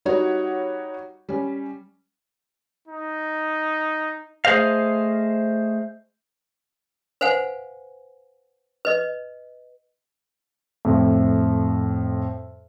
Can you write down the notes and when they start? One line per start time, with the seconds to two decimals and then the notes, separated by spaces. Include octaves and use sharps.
0.05 G3 D#4 F#4 C#5 F#5
1.29 G3 C#4
2.88 D#4
4.45 A3 G#4 C5 D#5 F5
7.21 B4 C5 F5 F#5 G#5
8.85 B4 D#5
10.85 F2 A2